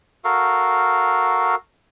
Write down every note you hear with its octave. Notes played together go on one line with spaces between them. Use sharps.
F#4 A4 A#4 F5